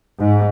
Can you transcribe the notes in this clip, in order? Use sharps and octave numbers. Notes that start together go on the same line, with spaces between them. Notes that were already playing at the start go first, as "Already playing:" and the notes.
G#2